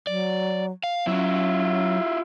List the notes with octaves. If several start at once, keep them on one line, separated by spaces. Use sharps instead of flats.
F#3 D5
F5
F#3 C#4 E4 F4